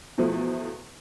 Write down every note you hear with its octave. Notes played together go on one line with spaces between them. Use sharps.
E2 B2 F3 A3